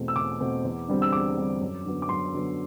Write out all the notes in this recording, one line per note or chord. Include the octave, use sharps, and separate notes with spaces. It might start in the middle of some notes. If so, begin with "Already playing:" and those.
Already playing: E2 B2 A3 C4
E6
E2 D6
B2 A3 C4
E2
D3 G3 C4
E6
E2 D6
D3 G3 C4
F#2
D3 F#3 B3
D6
F#2 C6
D3 F#3 B3